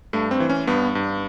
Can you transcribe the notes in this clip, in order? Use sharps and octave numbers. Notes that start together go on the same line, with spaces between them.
G2 A3
C4
E3
C#4
G2 B3
G2